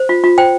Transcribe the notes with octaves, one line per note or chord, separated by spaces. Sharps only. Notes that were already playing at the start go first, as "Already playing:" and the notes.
Already playing: C5
F4
F4
C5 G5